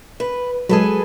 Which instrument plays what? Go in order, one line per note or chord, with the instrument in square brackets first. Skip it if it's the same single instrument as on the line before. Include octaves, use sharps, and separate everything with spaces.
[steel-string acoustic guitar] B4
[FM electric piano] F#3 G#3 [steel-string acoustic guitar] G#4 A4 B4